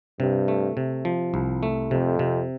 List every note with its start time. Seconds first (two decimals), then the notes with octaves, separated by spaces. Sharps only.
0.20 G2 C3
0.48 A3
0.77 C3
1.05 F3
1.34 C2
1.63 A3
1.91 F2 C3
2.19 C3